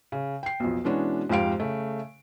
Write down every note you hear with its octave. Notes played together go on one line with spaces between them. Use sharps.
C#3
G5 C7
B1 F2
B2 E3 G#3 C#4 D4 F#4
F2 G#2 G4 F5 D7
C#3 A3